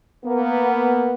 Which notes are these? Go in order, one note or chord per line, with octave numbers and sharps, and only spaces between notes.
A#3 B3